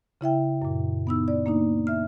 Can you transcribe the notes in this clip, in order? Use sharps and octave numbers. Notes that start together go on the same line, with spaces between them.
C#3 E4 E5 G5
F#2 A#2
B3 D#4 E6
D5
A#3 D4 D#4
E5 F6